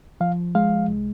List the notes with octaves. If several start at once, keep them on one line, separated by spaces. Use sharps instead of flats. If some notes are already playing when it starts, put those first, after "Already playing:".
F3 F5
G#3 F5
C2